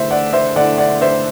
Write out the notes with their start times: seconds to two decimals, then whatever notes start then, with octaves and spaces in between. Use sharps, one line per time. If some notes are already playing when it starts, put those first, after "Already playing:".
Already playing: D3 A3 E4 C5 E5
0.11 D5 F#5
0.33 C5 E5
0.56 D3 A3 E4 D5 F#5
0.78 D5 F#5
1.01 C5 E5